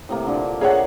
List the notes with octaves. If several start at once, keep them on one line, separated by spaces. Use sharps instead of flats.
A2 C3 A#3
A#2 D3
A#3 G#4 C#5 E5 F#5